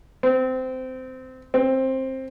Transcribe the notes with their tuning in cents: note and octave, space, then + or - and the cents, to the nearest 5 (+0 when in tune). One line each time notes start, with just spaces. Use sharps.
C4 -20
C4 +15